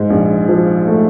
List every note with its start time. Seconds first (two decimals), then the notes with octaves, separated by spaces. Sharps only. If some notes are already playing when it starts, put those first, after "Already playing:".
Already playing: G#2
0.10 A#1
0.49 F3
0.87 A3